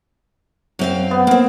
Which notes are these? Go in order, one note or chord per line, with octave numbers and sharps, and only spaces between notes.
F#2 C4 F5
B3
A#3 C4